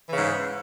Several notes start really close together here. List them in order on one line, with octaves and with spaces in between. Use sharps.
E3 C#3 G#2